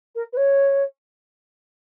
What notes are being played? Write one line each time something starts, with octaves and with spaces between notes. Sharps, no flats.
A#4
B4
C#5